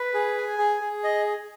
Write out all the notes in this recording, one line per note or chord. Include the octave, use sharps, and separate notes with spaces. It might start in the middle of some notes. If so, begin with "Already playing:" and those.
Already playing: B4
G#4
G#5
G#4
G#4
D#5